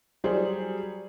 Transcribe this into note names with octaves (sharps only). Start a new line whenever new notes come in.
F#3 G3 G#4 C5